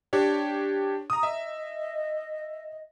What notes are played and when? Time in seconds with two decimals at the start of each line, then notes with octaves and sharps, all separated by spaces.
0.13 D4 G4 C#5
1.10 A#5 D#6
1.23 D#5 E5